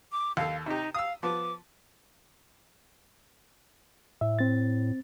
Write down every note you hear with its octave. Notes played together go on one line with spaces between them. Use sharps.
D6
D#2 A4 F5
C3 D#4 G4
F5 D#6 E6
F3 B3 D6
A2 E5
C4 A6